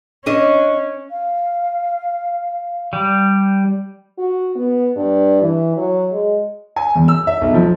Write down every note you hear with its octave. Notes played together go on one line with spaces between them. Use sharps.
C#4 D4 D#5
F5
G3
F#4
B3
G2
E3
F#3
G#3
G#5
E2
E6
E5
B1
F3